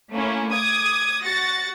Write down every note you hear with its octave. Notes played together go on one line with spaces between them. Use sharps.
A3 A#3 C#4 E4
D6 D#6 G#6
F#4 A6 A#6 C#7